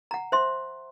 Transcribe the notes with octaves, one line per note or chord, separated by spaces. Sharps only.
F#5 A#5
C5 E5 C6